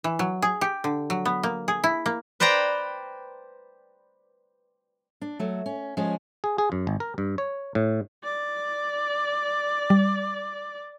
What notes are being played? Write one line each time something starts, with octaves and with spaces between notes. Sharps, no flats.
E3
F#3
G#4
G4
D3
F#3
B3
A#3
G#4
E4
A#3
B4 C5 D5 G5 A#5
D4
F#3 A3
C#4
F3 G#3 C#4 G#4
G#4
G#4
F#2
G#1
A#4
G2
C#5
A2
D5
G3